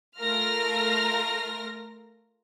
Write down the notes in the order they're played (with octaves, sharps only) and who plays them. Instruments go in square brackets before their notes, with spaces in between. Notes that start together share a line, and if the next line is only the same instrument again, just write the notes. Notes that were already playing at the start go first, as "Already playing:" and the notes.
[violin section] A3 F4 A#4 F6 A#6